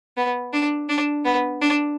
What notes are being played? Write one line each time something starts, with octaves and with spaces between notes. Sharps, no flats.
B3
D4
D4
B3
D4